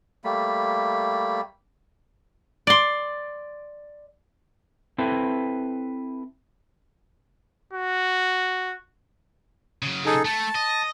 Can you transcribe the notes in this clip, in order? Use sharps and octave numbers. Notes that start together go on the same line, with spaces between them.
G3 A3 A#3 B5
D5 C6
C4 E4 A4 B4
F#4
C#3 F#3
D#4 G#4 A4
A3 A5
D#5